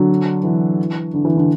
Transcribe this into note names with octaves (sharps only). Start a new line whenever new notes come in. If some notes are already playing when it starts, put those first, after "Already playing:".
Already playing: D3 F#3
E3
D3
E3
D3